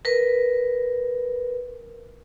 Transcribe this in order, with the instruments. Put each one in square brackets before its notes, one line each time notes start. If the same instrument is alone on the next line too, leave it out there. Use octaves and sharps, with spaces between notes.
[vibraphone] A#4 B4